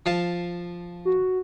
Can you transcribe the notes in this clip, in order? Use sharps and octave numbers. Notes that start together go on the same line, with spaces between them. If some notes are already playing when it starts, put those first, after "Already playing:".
F3 F5 A5
F#4